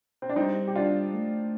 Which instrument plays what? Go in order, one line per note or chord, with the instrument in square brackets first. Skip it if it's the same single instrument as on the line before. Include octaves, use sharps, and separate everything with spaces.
[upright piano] C4
D4
[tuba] G3 [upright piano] C4 D#4
[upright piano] G4
D4 F4
[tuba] A3